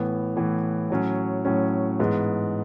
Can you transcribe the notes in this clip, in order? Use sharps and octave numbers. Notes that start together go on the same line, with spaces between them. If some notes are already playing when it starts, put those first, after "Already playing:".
Already playing: A2 E3 B3
A2 E3 B3
A2 F#3 C#4
A2 F#3 C#4
G#2 E3 G#3 B3